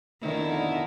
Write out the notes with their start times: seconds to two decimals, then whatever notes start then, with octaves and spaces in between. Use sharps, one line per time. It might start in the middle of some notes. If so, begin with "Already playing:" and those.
0.23 F2 B2 D3 D#3 E4